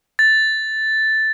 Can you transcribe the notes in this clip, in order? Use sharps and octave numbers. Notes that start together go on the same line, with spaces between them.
A6